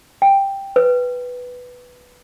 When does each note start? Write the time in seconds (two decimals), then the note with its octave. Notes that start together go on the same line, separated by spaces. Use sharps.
0.22 G5
0.76 B4